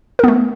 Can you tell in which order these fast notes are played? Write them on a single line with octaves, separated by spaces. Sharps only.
A#4 B3 A3